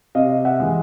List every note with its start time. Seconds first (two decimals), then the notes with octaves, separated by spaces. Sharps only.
0.15 C3 D#5 F5
0.45 E5 F#5
0.60 E3 G#3